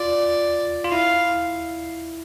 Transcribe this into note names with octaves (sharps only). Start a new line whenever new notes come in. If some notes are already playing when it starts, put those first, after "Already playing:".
Already playing: F4 D5
F4
E4 F5